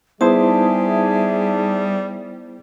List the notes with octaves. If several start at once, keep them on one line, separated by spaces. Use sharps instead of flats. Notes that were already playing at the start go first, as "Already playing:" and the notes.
G3 B3 D#4 E4 G#4 C5 E5 A5